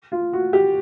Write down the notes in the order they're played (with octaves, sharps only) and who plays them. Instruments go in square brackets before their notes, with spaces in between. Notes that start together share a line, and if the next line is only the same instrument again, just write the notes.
[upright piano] F4
F#4
G4